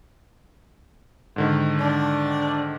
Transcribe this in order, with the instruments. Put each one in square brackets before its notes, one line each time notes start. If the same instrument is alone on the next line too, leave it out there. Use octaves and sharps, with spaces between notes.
[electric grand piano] G#2 D3 D#3
[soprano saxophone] D4